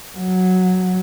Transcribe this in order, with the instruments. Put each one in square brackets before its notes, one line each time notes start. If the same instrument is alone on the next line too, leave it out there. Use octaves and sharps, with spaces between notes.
[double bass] F#3